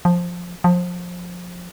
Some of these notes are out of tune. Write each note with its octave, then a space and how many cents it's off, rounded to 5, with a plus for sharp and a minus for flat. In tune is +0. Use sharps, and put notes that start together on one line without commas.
F3 +10
F3 +25